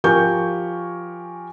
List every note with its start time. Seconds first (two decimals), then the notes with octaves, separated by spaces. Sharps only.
0.04 F3 G4 A#4 G#5 C#6 G6